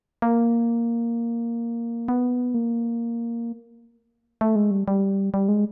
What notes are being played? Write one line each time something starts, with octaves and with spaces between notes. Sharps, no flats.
A#3
B3
A#3
A3
G#3
G3
G3
G3
G#3